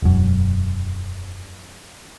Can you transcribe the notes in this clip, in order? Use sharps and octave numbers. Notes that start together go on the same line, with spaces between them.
E1 F#2